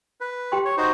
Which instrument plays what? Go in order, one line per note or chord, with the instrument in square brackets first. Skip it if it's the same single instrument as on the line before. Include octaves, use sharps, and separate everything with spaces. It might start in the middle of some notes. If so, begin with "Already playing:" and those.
[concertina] B4
[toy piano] G4 G5 C6
[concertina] C#5
D#4 F#4 C5